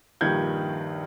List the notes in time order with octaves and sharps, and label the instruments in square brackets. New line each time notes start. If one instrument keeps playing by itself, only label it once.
[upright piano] A#1 G2 D#3 G6 G#6